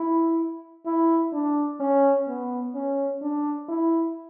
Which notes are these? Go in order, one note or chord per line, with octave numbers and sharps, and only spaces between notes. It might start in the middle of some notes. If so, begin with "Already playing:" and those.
Already playing: E4
E4
D4
C#4
B3
C#4
D4
E4